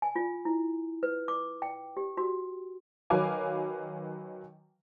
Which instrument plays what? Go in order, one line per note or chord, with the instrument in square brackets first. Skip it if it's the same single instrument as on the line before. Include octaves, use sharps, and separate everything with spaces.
[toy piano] G#5
F4
E4
B4
D6
G5
G4
F#4
[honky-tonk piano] D#3 F#3 B4 F5 G#5 D6